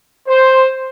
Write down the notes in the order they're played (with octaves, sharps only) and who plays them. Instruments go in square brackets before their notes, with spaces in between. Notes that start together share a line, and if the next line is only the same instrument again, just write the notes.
[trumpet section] C5